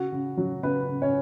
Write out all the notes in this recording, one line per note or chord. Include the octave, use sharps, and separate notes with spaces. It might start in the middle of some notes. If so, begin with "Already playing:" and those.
Already playing: C#3 F#4
C#3
F#3
C#3 B3 B4
C#3
C#4 C#5